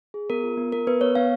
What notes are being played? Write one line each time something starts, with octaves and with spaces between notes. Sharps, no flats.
G#4
B3 A#4
F4
B3
B3 A#4
B3 B4
B3 C#5
B3 F5